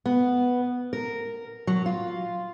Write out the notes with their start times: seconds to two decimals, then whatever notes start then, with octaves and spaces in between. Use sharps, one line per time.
0.06 B3
0.93 A#4
1.67 F#3
1.86 F4